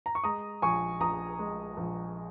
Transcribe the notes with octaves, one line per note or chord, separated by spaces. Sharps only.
A#5
C#6
G#3 A#5 D#6
A#1 G#5 C#6
A#1 A#5 D#6
G#3
A#1